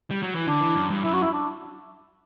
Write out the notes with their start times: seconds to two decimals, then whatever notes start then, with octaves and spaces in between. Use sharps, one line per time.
0.11 G3
0.23 F#3
0.35 E3
0.47 D3 D4
0.61 E3
0.75 F#2
0.90 G2
1.04 F#2 E4
1.13 F#4
1.22 E4
1.33 D4